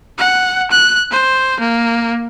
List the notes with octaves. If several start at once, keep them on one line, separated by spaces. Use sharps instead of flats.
F#5
F#6
C5
A#3